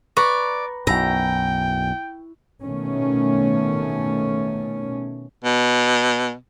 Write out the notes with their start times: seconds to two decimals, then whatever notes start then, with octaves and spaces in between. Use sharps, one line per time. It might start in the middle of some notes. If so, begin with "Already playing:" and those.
0.17 B4 D5 A#5 C#6
0.87 B1 F#2 E4 G5 A#5
2.62 B2 D#3 A3 C#4
5.44 B2